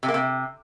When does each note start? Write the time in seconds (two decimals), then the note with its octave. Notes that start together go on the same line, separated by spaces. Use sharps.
0.03 C3
0.08 A#3
0.14 C3